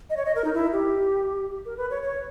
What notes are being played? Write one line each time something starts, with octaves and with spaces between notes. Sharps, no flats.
D#5
C#5
D#5
A#4
D#4
E4
G4
A#4
B4
C#5
C#5